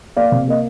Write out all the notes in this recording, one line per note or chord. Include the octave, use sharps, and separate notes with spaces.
A#3 D5 F5
C3
A#3 D#5